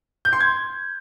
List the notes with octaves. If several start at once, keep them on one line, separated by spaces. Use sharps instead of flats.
G6
C6
G#6